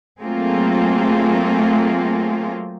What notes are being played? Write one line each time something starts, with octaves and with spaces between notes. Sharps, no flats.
F#3 A3 A#3 C4 F4 G#4